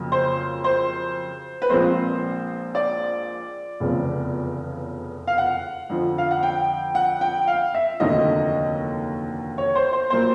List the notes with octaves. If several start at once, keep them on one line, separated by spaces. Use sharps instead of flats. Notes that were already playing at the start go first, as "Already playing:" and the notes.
Already playing: F2 C#3 F#3 A#3
C5
C5
B4
A#1 A#2 F3 G#3 C4 C5
D5
F1 E2 C#3 F3
F5
F#5
F2 D3 F3
F5
F#5
G5
F#5
G5
F5
E5
F1 D#2 D3 F#3 D#5
C#5
C5
C5
A#2 F#3 A#3 C5